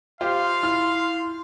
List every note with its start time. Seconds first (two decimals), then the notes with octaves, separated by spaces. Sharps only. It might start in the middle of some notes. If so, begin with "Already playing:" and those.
0.21 F4 G4 C5 F5 C6
0.63 E4 F6